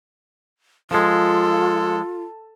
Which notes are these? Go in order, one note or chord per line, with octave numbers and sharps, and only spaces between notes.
F3 G#3 F4 A4